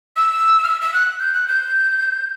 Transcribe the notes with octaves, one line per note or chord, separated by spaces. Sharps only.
E6
F6
E6
E6
F#6
G6
F#6
G6